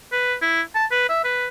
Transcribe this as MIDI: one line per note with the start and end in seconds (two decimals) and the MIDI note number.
0.12 0.35 71
0.42 0.62 64
0.75 0.86 81
0.91 1.05 71
1.09 1.22 76
1.24 1.48 71